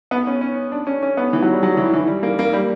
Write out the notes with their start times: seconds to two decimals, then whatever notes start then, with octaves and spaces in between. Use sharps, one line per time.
0.11 B3
0.27 C#4
0.41 C#4
0.72 D4
0.87 C#4
1.03 C#4
1.17 B3
1.33 E3
1.42 F#3
1.53 G3
1.63 F#3
1.77 E3
1.93 E3
2.07 G3
2.23 A#3
2.39 A#3
2.53 G3